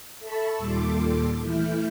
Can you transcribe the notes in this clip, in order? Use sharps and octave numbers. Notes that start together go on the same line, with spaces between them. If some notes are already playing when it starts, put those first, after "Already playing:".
A4 E5 A5 B5 C#6
D#2 A#2 G3 A4 C6 D6
E3 A3 E4 F6 G6